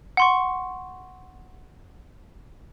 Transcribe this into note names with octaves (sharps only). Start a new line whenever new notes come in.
F#5 C6 C#6